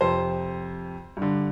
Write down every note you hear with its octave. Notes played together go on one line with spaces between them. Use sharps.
F2 C3 C5
G2 D3